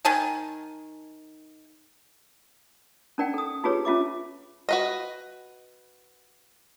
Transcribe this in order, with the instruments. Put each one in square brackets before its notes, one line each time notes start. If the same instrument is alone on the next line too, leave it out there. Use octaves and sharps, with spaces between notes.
[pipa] D#3 G#5 A5
[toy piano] C#4 D#4 A#4 D5 F#5 G5
A4 D#6
D#4 F4 G4 G#4 B4 C#5
C#4 F4 E5 D6
[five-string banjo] F#4 B4 D#5